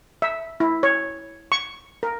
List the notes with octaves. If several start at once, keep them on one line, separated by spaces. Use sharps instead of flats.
E5
E4
C#5
C#6
A#4